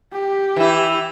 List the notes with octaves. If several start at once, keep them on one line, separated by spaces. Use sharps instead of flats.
G4
E3 E4